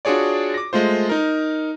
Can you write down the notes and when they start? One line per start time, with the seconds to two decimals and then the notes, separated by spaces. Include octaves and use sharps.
0.05 D4 F4 F#4 G#4 C#5 D5
0.54 D6 A#6
0.73 G#3 A3 F4 C5
1.09 D#4 A#4